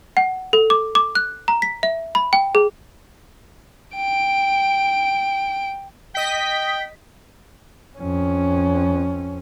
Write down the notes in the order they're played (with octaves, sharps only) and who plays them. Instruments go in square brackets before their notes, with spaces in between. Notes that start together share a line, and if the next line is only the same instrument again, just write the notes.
[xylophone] F#5
A4
D6
D6
F#6
A#5
B6
E5
B5
G5
G#4
[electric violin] G5 D7
[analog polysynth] D#5 B6 [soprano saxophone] G5
[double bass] F2 C#4